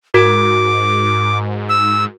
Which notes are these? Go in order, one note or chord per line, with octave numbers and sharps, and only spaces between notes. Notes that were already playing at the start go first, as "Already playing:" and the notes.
G#2 F#4 A#4 D6
E6